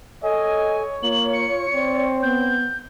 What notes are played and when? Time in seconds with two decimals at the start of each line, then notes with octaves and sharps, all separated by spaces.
0.23 A4 C#5 D#5 G#5
1.03 A#3 F4 F#7
1.33 C#7
1.74 C4 D5
2.23 B3 G6